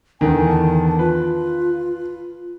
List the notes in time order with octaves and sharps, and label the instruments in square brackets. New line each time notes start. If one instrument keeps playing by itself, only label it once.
[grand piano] E2 D3 D#3 [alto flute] G#5
[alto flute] A5
[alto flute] F4 [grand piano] B4